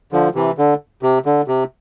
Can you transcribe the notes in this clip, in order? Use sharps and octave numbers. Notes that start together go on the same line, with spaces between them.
D3 F3
C3 E3
D3
C3
D3
C3